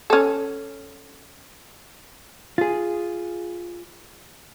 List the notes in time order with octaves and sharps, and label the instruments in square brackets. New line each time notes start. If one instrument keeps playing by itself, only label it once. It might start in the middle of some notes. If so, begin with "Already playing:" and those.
[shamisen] C#4 A4
[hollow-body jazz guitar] F4 G#4